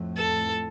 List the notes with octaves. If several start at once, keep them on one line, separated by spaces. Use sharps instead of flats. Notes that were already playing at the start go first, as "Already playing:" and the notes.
Already playing: F2 A2
A4